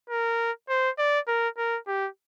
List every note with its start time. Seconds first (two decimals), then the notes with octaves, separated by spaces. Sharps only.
0.10 A#4
0.69 C5
0.99 D5
1.28 A#4
1.57 A#4
1.88 G4